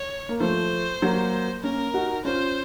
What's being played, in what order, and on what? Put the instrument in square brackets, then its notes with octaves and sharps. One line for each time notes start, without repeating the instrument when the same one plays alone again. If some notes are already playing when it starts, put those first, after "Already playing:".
Already playing: [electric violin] C#5
[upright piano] A#3
[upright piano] F3 A3 [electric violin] C5
[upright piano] F#3 A#3
[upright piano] A#3 C#4 [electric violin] A#4
[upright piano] D#4 F#4
[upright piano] C#4 F4 [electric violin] C5